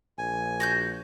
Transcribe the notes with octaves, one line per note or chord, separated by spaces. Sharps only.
A#1 G#5
F#4 F#6 G6